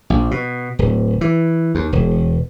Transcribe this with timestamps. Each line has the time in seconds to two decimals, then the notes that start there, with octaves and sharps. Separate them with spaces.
0.10 A#1
0.31 B2
0.79 D1
1.21 E3
1.75 D#2
1.93 E1